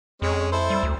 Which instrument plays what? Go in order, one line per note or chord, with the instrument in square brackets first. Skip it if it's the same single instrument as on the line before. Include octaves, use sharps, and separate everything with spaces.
[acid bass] F2 [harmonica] G#3 C#4
[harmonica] E4 A4 C5
[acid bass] G3
D2